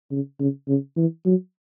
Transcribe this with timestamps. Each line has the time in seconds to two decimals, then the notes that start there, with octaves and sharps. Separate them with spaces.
0.11 C#3
0.40 C#3
0.68 C#3
0.97 E3
1.26 F#3